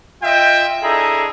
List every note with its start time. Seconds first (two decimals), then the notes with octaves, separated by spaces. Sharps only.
0.22 F4 D#5 E5 G5
0.83 D4 E4 G#4 A4 D#5 A#5